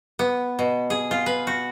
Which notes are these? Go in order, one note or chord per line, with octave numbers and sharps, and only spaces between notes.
B3
B2
G#4
F4
B4
F#4